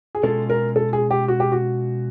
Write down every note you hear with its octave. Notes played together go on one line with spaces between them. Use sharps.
G#4
B2 G#3 C#4 F4 A4
A#4
A4
G#4
G4
F#4
G4
F#4